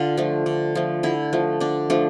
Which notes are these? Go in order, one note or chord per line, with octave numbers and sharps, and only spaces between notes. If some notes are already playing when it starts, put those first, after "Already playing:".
Already playing: D3 F4
F3 A3
D3
F3 A3
D3 E4
F3 A3
D3 D4
F3 A3 D4